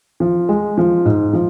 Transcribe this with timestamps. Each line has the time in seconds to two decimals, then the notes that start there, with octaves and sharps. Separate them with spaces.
0.20 F3
0.49 G#3
0.77 F3
1.05 G#2
1.33 F3